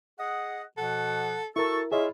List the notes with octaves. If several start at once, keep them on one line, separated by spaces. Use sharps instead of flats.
G#4 D#5 F#5
B2 F3 A4 F#5
E4 F#4 A4 A#4 C#6
E4 F4 G#4 C#5 D#5 E5